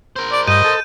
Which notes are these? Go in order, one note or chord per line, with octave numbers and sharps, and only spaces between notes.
A#4 C5
D5
G2 D#5 G6 D#7
A4